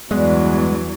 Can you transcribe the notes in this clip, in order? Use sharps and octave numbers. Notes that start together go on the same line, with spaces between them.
E2 G2 E3 F#3 G#3 B3